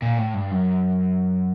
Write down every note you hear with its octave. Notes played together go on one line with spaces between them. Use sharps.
A#2
A2
G2
F#2